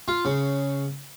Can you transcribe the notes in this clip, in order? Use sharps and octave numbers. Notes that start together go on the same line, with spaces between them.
F4
C#3